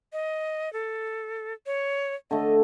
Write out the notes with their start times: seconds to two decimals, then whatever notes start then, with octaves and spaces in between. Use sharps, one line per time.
0.13 D#5
0.73 A4
1.66 C#5
2.31 D3 A3 D#5